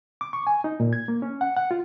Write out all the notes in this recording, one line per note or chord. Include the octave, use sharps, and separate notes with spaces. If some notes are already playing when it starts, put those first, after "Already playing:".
D6
C#6
G#5
D#4
A#2
G#6
A#3
C#4
F#5
F#5
F4